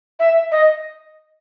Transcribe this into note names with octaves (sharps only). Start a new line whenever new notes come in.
E5
D#5